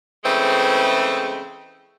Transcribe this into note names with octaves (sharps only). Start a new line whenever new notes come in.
C#3 E3 G#3 A3 C4